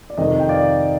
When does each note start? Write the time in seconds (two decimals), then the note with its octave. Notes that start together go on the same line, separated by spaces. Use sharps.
0.10 D5
0.17 F2 C3 D#3 D#5
0.40 G5
0.49 D5 F5